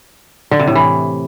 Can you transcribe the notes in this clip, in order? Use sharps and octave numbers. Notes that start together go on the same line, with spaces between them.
D3
C3
A2
E3